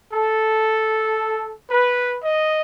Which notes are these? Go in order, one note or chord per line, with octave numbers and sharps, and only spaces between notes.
A4
B4
D#5